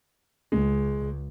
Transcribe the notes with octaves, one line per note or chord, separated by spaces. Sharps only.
C#2 G#3